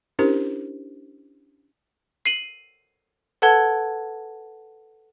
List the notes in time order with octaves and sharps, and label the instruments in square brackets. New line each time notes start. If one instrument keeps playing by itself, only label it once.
[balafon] C#4 D4 E4 G4 A#4 C5
[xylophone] C7 D#7 F#7
A4 B4 F#5 A5 G#6 G7